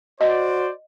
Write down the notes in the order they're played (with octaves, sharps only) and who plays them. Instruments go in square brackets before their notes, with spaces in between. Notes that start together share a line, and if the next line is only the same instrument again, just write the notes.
[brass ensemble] F#4 C5 D5 [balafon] D#5